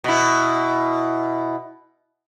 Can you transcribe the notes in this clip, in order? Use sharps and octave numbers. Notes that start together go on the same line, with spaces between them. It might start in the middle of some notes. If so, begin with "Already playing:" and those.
B2 E4